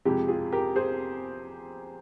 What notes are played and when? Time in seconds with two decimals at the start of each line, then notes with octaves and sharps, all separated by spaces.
0.05 F2 C3 F3 G#3 G4
0.28 F4 G#4
0.52 G4 A#4
0.76 G#4 C5